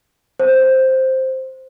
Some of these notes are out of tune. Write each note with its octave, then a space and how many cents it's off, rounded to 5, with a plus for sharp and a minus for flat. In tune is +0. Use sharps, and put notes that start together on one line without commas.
C5 +5